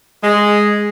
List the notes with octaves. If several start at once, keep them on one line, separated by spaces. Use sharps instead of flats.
G#3